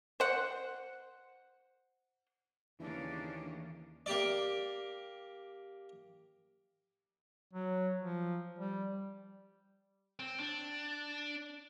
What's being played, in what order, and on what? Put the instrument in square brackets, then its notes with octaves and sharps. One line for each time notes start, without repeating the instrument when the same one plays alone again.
[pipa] C5 F#5
[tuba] D#2 [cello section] C#3 A#3 C#4 [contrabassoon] E3 [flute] D4
[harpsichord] A#3 G4 D5
[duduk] F#3
F3
G3
[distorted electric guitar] C4
D4